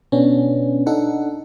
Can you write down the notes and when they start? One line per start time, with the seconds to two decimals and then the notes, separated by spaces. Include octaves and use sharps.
0.12 B2 B3 C#4 D4
0.86 D4 D#4 A4 F#5